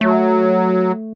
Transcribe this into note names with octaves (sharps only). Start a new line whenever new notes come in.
F#3 A3